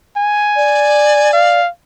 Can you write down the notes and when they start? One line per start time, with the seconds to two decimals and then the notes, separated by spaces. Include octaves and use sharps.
0.17 G#5
0.57 D5
1.34 F5